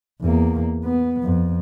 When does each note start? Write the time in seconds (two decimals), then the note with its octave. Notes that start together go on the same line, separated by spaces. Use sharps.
0.21 E2 A#3
0.85 B3
1.23 F2